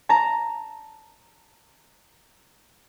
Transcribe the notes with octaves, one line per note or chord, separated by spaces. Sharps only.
A5 A#5